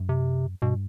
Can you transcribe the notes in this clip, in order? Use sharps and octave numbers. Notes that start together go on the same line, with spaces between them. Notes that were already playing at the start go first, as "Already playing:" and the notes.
Already playing: F#2
C3
G2 B2